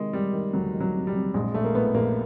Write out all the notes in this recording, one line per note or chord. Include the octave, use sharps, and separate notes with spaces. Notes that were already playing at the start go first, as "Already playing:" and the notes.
Already playing: C3 D#3 G#3
D#3 G3
D#3
D2 F#3
D#3
F#3
C3
G3
C3
A#1 G#3
A#1 A3
A#3
A2 B3
A#1 A#3